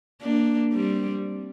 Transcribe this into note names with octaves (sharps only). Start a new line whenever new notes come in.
A#3 D4
G3 C4